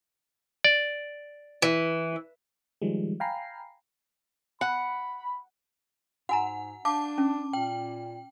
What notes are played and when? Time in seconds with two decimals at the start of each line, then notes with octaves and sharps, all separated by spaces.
0.64 D5
1.62 E3
2.82 D#3 F3 G3 G#3
3.20 F5 G5 G#5 A#5 B5 C7
4.61 F#5 B5
6.29 G#2 F#4 F#5 G#5 A#5
6.85 D4 F5 A5 D6
7.18 C#4
7.53 A#2 G5